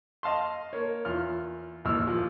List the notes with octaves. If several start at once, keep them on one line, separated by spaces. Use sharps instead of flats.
D#5 F5 A5 C6
A#3 C#5
E2 F4 F6
G#1 D#2 E3 E6 F6
A#2 F3